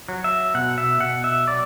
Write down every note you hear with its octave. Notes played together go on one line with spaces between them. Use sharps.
F#3
E5
B2 F#5
E5
B2 F#5
E5
F#3 D5